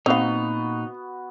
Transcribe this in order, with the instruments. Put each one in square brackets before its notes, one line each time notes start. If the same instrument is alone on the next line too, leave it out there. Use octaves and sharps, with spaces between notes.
[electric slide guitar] A#2 D#4 [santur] B3 F#4 D#6 [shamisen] C4 F5